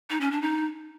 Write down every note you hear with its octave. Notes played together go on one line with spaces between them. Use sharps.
D#4
C#4
D4
D#4